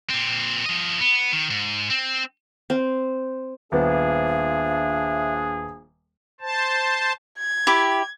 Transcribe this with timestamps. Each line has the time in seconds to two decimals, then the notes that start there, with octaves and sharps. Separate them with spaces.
0.10 A#2 C4
0.66 F3 D#5
1.00 B3
1.33 D#3
1.50 G#2
1.90 C4
2.70 C4
3.72 D#1 F3 A#3 B3 D4 G#4 E5
6.41 C5 A5
7.38 G#6
7.67 E4 G4 D6